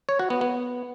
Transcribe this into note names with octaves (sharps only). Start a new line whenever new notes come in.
C#5
F#4
B3
B3